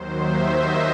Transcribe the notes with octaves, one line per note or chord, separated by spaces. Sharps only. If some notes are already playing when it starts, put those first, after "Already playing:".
Already playing: D#2 D#3 F#3 C5
E5
D#5